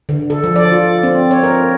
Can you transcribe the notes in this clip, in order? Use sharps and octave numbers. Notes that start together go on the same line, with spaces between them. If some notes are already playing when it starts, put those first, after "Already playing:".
D3
A4
F3
D5
F4
C4
C#5
A#4